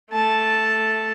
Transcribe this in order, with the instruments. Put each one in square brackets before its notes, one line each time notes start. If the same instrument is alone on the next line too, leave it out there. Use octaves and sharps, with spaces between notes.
[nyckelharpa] A3 A5